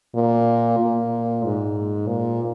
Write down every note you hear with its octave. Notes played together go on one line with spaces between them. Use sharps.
A#2
A#2
G#2
A#2